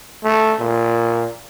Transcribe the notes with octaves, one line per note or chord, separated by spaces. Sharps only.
A3
A#2